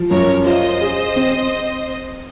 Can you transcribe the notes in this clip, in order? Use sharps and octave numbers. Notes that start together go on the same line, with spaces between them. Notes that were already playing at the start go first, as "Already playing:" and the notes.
Already playing: F3
F#2 A#4 C#5
F4 C5 D#5
G#4
C4